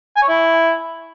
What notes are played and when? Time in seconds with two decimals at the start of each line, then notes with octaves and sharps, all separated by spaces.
0.16 G#5
0.22 C#5
0.29 E4